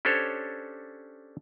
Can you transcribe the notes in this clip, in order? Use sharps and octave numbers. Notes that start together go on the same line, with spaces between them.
C#4 D4 G4 A4 C5 C#5